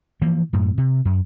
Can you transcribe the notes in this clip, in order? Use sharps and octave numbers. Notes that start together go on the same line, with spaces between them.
E3 F3 A#3
F#2 A2
C3
F#2